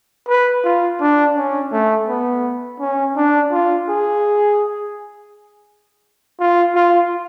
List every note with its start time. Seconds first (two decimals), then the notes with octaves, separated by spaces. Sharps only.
0.29 B4
0.65 F4
1.01 D4
1.36 C#4
1.72 A3
2.08 B3
2.80 C#4
3.16 D4
3.52 F4
3.89 G#4
6.40 F4
6.75 F4